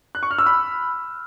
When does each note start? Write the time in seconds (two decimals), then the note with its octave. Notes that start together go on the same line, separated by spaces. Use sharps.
0.15 F#6
0.23 C#6
0.31 F6
0.38 E6
0.46 B5